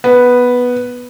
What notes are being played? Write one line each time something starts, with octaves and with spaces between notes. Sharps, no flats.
B3